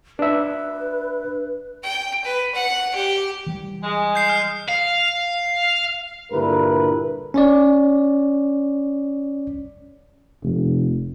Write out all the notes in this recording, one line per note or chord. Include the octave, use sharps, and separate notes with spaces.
D4 B4 E5
G5
B4
F#5
G4
E3 G3
G#3
G6 C7
F6
F5
G2 A#2 D3 E4 A#4 B4
C#4 C#5 D5
F1